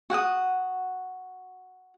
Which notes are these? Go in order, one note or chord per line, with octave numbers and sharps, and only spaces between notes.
F#4 F#5 G5 D#6